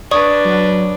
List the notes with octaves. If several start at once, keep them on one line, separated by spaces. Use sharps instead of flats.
D4 B4 D5 C#6 D#6
F#3